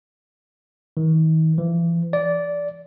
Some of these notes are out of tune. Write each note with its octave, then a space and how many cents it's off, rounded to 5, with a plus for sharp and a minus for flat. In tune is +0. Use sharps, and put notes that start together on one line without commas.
D#3 +40
E3 +40
D5 -15